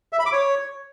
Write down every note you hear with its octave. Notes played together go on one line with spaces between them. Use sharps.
E5
B5
D6
C#5